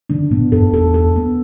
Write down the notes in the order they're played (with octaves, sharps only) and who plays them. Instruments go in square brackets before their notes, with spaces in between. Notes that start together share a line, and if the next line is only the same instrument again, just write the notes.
[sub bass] D3 [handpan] D4
[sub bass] A2 [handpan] B3
[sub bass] F#2 [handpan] A4
[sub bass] E2 [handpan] A4
[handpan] A4
B3